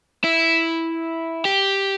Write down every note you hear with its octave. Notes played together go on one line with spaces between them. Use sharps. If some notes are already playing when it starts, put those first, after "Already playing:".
E4
G4